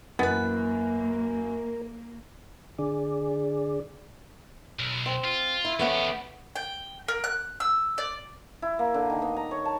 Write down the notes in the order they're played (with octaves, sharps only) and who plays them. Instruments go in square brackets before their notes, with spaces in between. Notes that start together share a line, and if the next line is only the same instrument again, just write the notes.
[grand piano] F#2 E3 A6 [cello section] A#3 [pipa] B3 B4 [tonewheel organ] A#4
[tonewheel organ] D3 G#4 D5
[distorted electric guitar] B1
[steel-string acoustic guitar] C4
[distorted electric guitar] F4
[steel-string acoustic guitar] E4
[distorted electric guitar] E2 G4 [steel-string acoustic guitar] A3 B3 C#4
[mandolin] G5
A#4
F#6
E6
D5
[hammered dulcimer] E4
A#3
D3
D#3
B3
A#5
C#5
A5